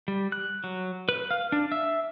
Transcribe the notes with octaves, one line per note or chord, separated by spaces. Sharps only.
G3
F#6
F#3
B4
F5
D4
E5